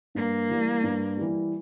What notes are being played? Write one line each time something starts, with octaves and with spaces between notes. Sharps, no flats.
G2 A#3
E3 G3
G2
E3 G3